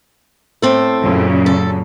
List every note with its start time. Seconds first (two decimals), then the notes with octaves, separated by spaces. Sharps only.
0.62 A2 C4 A4
1.03 F#2 A#2 C#3
1.46 A4